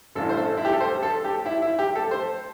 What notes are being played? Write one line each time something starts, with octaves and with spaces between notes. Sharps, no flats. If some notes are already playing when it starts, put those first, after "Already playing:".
A1 G2 E3 A4
C5
A4
E4
G4
A4
C5
A4
G4
E4
E4
G4
A4
C5